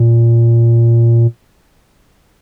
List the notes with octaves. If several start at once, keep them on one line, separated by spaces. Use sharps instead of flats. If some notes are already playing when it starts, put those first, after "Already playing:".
Already playing: A#2